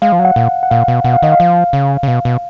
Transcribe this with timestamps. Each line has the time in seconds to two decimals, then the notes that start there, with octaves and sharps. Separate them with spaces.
0.02 G#3 F5
0.12 F3
0.19 F#3
0.25 F#5
0.36 A#2
0.63 F#5
0.71 A#2 F5
0.88 B2
1.05 B2 F#5
1.14 F5
1.23 D#3 D#5
1.32 F5
1.40 F3
1.73 C#3
2.03 C#3
2.08 B2 F5
2.25 B2